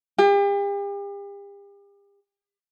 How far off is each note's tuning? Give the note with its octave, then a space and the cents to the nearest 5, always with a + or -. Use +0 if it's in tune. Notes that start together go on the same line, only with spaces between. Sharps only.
G4 +40